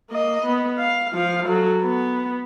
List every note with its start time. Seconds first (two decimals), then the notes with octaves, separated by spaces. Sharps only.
0.10 A#3 D#5
0.45 B3
0.78 F5
1.13 F3 F5
1.47 F#3 A4
1.83 B3